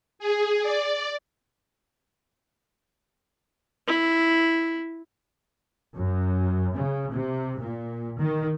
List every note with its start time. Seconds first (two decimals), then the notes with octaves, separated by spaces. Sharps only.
0.19 G#4
0.62 D5
3.88 E4
5.97 F#2
6.74 C#3
7.11 C3
7.61 A#2
8.19 D#3